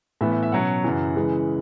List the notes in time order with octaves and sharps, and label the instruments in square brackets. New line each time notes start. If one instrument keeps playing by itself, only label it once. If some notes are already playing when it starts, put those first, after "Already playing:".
[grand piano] A2 E3 B3 E5
E5
E5
B2 F#3 C#4 F#5
F#2 C#3 E3
C#3 E3 G#3